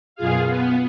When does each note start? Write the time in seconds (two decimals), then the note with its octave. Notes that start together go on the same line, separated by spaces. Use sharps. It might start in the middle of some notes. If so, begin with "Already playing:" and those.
0.16 F#2 B2 F4 G#4 F5
0.46 B3